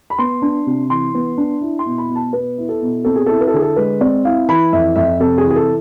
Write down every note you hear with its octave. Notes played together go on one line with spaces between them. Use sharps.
B5
B3 C6
D4
C3
E3 C6
B3
D4
E4
C6
B2
B5
B2
A5
B3 B4
E4
A4
B2
C4 A4
G#4
E4 A4
B4
A4
D3 G#4
A4
G#3 B4
C4 D5
E4 F5
E3 B5
F2 E5
F2 E5
C3 A4
G#4
E3
G#4
A4